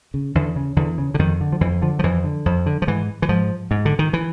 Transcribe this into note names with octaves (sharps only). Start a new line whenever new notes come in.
C#3
E2 D3
C#3
E2 D3
C#3
D3
F2 D#3
D3
F3
F2 E3
D3 F3
F3
F2 E3
D3
F2
D3
F3
G#2 E3
E3
G#2 F3
G#2
D3
D#3
E3